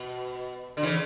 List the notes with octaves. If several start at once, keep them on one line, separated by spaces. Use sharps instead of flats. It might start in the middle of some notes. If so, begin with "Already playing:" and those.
Already playing: B2
D3
C#3 E3